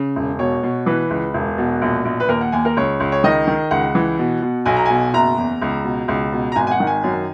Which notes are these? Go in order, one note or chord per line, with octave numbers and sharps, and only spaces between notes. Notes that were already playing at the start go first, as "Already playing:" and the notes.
Already playing: C#3
E1
B2 C#5
B2
E3 B4
C#2
E1
B2
A#1
A#1
B4
D#2 A#4
F#5
D#2 G#5
A#4
C#2 C#5
C#2
C#5
D#3 D#5
D#3
C#2 F#5
E3
B2
B2
B1 G#5
A#5
B2 G#5
F#1 A#5
E2
C#2
B2
C#2
B2
A#5
G#1 G#5
G#5
F#5
D#3
G#5
F#2